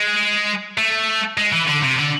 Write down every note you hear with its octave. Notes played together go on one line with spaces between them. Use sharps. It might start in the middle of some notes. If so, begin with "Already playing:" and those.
Already playing: G#3
A3
G#3
E3
D3
C3
D3